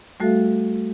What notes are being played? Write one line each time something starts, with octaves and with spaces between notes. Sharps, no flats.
G3 A3 F#4 A4 E5 F5